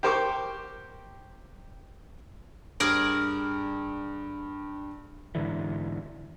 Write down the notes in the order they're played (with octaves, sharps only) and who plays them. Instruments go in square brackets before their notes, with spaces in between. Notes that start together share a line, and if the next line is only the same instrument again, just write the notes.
[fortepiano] G4 A#4 C5 G5 C#6 D6
[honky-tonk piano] G2 [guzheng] G#4 A#4 D5
[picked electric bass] G#2 D3 E3